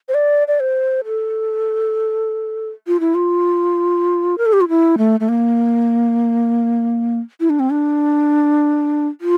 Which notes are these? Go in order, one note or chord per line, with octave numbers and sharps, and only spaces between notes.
C5
D5
D5
C5
A4
F4
E4
F4
A#4
A4
G4
F4
E4
A3
A3
A#3
E4
D4
C4
D4
F4